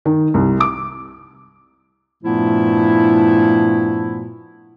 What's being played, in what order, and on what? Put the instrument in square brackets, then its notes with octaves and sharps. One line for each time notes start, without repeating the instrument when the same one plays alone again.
[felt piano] D#3
C2
D6
[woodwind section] G2 A#2 F3 A3 B3 E4